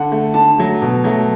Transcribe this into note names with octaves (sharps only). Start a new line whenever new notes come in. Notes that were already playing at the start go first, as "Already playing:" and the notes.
Already playing: D3 F#5
A3
D3 A5
F#3 A3
B2
F#3 A3